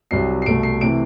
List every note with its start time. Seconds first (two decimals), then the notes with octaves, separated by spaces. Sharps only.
0.11 C2 C3 F#3 C7
0.42 C7
0.46 C2 B2 A3 D7
0.63 C7
0.81 C3 E3 A3 D7